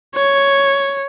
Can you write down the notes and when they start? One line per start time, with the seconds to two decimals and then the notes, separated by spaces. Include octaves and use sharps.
0.16 C#5